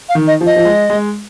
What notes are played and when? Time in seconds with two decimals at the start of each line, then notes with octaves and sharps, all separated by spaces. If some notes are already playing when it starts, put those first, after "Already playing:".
0.09 F5
0.15 D#3
0.27 D#5
0.41 F3
0.46 D#5
0.56 F3
0.65 G#3
0.90 G#3